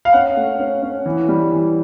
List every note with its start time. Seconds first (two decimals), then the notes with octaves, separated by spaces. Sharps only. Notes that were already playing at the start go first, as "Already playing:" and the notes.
0.05 F5
0.13 C#4 F#5
0.37 A3
0.59 C#4
0.82 C#4
1.06 E3
1.29 G3
1.52 E3